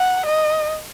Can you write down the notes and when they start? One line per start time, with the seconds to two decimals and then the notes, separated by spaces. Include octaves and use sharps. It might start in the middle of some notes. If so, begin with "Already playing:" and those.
Already playing: F#5
0.26 D#5